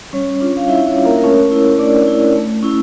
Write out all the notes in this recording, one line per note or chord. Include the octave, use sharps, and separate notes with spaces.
G3 C#4 C#5
D4 F4
F5
G3 E4 E5
C#4 C#5
D4 F4
A#3 A#4
A#4
A3 C#4 C#5
E4
A3 D4 D5
E4
A3
C#4 E4